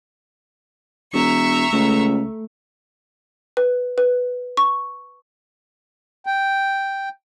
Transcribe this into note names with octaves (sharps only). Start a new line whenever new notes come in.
E1 E5 A#5 C#6
C#2 A3
B4
B4
C#6
G5